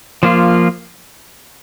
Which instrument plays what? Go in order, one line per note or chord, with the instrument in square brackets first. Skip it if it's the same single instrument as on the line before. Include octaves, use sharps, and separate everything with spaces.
[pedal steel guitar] F3 A#3 F4